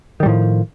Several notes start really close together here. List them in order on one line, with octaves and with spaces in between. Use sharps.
D#3 G3 A2 F3